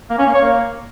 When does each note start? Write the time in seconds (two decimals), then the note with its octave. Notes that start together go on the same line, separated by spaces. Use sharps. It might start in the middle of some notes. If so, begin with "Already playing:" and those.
0.10 A#3
0.18 C#4
0.26 A#3
0.34 C#5
0.42 A#3